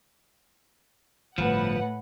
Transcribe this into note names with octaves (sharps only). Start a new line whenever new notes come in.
G1 A2 F3 B4 F#5